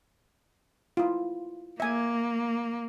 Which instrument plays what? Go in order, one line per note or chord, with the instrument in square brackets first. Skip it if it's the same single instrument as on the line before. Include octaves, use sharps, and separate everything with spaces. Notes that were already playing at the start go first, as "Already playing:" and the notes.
[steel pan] E4 F4
[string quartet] A#3 [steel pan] E5 G#5